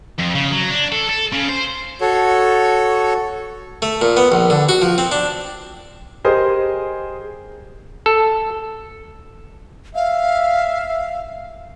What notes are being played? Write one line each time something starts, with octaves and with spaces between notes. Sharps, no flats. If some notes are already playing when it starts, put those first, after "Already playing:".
F2
C#3
F#3
D4
A4
A4
C#3
C5
F#4 A4 C#5
A3
A#2
B3
A#1
D3
F#4
F3
C4
D4
G4 G#4 A#4 C5 D#5
A4
E5 F5